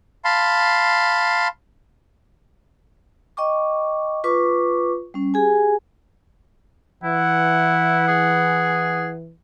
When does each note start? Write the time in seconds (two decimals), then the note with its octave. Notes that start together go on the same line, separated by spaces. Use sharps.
0.25 F5 A5 B5 C6
3.37 D#5 G5 C#6 D6
4.24 F4 B4 C#6 D6
5.14 G3 C#4
5.34 G4 G#4 G#5
7.04 E3 E4 F#5
8.08 G#4